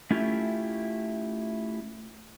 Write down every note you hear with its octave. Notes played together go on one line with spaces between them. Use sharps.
A3 C#4 E4 F4 G4